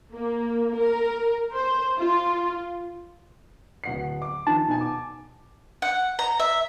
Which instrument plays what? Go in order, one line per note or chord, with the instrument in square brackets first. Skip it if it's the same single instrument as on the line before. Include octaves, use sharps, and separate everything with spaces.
[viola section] A#3
A#4
C5
F4
[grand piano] D1 F#5 C7
D6
[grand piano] D#3 F3 D#4 [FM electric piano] A5
[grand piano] B2 D#4 G#5
D6
[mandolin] F#5
A#5
E5